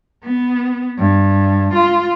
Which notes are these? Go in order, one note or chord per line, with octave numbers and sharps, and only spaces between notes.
B3
G2
F4